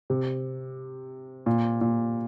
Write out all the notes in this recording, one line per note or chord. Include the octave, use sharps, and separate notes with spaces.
C3
A#2
A#2